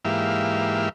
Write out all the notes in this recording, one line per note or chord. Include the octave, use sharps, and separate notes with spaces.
G#2 E3 A#3 G4 E5 F5